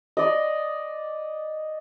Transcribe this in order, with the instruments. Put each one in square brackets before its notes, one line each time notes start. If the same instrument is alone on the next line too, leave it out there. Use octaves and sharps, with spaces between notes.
[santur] D5 D#5